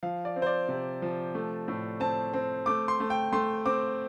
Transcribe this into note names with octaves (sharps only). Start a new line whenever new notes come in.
F3 F5
D5
C4
C5
D5
C3
F3
A3
A2
C4 A5
C4
A3 D6
C6
A3
G5
A3 C6
C4 D6